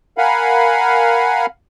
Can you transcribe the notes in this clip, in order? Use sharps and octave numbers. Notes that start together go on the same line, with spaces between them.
A#4 F5 F#5 G#5 B5